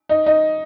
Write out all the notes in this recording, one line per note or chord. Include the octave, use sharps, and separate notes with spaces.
D#4
D#4